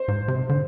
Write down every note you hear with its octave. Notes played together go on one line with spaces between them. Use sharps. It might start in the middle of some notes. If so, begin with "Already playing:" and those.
Already playing: C5
G#2
C3
D3